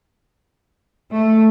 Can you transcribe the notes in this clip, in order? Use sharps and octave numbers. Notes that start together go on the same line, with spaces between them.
A3